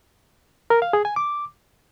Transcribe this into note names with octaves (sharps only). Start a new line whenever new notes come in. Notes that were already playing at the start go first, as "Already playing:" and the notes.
A#4
F5
G#4
G#5
D6